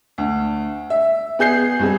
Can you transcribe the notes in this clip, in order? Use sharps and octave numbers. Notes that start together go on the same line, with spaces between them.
D2
E5
B3 G#4 G6 C7
G2 C4 G#4